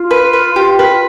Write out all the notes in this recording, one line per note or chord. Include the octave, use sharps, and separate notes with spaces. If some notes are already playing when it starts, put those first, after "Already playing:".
Already playing: F4
B4
B4
G4
B4